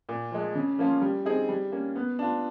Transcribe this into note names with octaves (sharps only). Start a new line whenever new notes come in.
A#2
F3 G#3
C#3
F3 A#3 C#4 F4
G3
C4 D#4 G#4
G3
A#3 C#4
B3
D4 F4